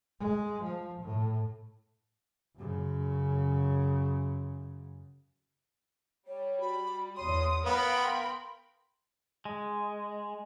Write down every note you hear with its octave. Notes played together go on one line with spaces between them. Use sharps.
G#3
F3
A2
F#2 C#3
G3 C#5
F#4 B5
E2 C#5 C6 D#6
B3 A#4 F5 G5 B5
F5 C6
G#3